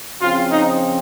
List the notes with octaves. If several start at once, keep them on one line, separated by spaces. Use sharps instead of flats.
C#3 F3 C4 F4
D#4